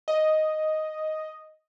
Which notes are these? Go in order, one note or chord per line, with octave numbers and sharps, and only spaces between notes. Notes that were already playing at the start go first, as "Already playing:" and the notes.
D#5